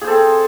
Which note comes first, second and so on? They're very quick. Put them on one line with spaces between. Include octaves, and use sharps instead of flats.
G#4 C5 A4 C4